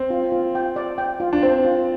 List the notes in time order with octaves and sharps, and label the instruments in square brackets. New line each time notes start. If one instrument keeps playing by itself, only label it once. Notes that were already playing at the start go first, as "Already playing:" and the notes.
Already playing: [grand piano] C4
[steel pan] F4
F4
G5
D5
G5
F4
[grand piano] D4
[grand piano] C4 [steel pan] C5
[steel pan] F4